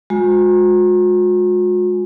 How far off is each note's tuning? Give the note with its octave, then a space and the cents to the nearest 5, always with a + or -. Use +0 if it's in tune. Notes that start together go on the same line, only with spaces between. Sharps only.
G#3 +0 F#4 -45